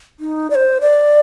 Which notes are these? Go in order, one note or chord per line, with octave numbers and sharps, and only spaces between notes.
D#4
D5
C5
D5